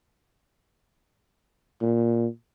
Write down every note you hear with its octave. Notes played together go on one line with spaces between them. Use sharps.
A#2